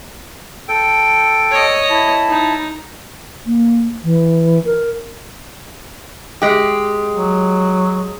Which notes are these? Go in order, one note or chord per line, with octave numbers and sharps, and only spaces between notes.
A4 G5
C#5 D#5
E4 A5
D#4
A#3
E3
A#4
G#3 G4
F#3